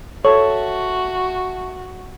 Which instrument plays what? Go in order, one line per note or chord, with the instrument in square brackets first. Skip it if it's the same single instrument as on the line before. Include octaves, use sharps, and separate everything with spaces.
[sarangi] F#4 [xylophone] A4 [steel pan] C#5 [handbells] E5 A5 C#6